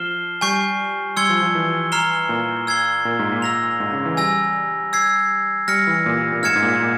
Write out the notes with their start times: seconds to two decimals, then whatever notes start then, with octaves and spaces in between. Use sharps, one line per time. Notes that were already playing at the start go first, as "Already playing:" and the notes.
Already playing: F3 F6 C7 E7 G7
0.41 G3 G#5 C#6 G6 C7
1.17 G3 C6 E6 G#6 C#7 G7
1.30 F3
1.42 F3
1.55 E3
1.92 A#5 F6 C7 E7 G7
2.29 A#2
2.67 E6 G#6 C7 G7
3.05 A#2
3.19 G#2
3.32 A#2
3.42 E6 A#6 F7
3.80 G#2
3.92 C#3
4.06 E3
4.17 G3 G#5 E6 A#6
4.93 E6 G#6 C7
5.68 G3 F6 A#6 C#7
5.87 E3
6.06 A#2
6.32 A#2
6.42 G#2 F6 G#6 C#7 E7
6.56 G#2
6.62 A#2
6.80 A#2